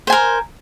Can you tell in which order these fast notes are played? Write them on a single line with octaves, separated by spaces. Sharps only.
C5 G#5 A#4